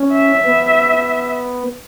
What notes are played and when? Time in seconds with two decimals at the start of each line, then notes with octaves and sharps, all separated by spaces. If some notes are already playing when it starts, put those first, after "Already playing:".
Already playing: C#4
0.13 E5
0.45 B3